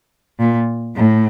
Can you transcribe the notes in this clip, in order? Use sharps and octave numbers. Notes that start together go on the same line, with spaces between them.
A#2
A2